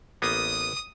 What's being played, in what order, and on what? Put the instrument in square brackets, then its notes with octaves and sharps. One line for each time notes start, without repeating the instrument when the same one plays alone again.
[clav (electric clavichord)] A1 A#3 B3 [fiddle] D#6